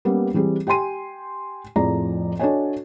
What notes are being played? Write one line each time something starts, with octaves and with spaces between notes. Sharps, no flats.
G3 A#3 B3 C#4
E3 G3 C4 G#4
G4 G5 G#5 C6 D#7
F2 A2 F3 G#4 D5 A#5
D4 F#4 A4 C#5 D#5 G#5